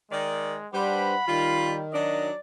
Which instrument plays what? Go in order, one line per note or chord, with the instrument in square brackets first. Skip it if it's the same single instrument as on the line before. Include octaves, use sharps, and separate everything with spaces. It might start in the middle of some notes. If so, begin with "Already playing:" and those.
[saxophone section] D#3 D5 [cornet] G#3
[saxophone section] G3 [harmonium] D4 B4 C5 [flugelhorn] F#5 [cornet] B5
[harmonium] D#3 [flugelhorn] G3 [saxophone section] F4
[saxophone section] F#3 D4 [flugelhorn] D5 [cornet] D#5